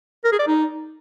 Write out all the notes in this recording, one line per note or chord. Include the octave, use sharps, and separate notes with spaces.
A#4
G#4
D5
D#4